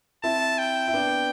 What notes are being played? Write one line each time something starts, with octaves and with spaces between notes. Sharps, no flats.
C4 E4 A5
G5
E4
B3 D4